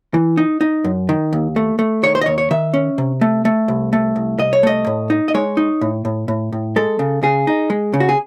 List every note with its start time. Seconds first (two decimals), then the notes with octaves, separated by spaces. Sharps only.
0.14 E3
0.37 D#4
0.61 D#4
0.84 F#2
1.09 D#3
1.33 D#2
1.56 A3
1.79 A3
2.03 D#3 C#5
2.15 C5
2.21 D#5
2.26 D#2 C#5
2.38 C#5
2.51 D#3 E5
2.74 C#4
2.98 C3
3.21 A3
3.45 A3
3.68 C2
3.93 A3
4.16 C2
4.39 C2 D#5
4.53 C#5
4.63 A3 D#5
4.87 A2
5.10 D#4
5.28 D#5
5.34 G#3 C#5
5.57 D#4
5.81 A2
6.05 A2
6.28 A2
6.52 A2
6.76 G#3 A4
6.99 C#3
7.23 C#3 G#4
7.47 D#4
7.70 G#3
7.94 C#3
8.00 F#4
8.09 G#4